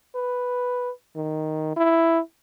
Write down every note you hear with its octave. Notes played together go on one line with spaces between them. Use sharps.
B4
D#3
E4